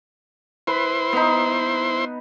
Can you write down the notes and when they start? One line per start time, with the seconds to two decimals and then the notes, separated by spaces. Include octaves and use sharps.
0.67 E4 B4 C5 C6
1.13 B3 D#4